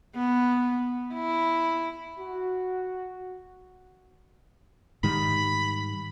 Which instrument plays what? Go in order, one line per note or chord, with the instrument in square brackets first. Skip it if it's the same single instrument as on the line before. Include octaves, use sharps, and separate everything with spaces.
[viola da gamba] B3
E4
[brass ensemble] F#4
[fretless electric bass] G#2 D#3 G3 [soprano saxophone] B5